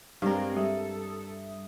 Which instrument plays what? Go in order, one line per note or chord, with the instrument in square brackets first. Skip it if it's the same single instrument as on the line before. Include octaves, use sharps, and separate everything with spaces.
[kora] G2 A#4 [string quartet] G#3 C4 D5 [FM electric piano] F5
[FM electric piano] G3 E5 D#6 [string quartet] A4